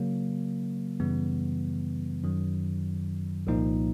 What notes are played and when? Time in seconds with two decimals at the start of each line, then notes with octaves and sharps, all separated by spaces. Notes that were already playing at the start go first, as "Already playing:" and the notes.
Already playing: C#3 F#3 A#3
1.00 F#2 C#3 E3 G3 B3
2.23 F#2 D#3 F#3
3.47 C2 A#2 F3 A#3 D#4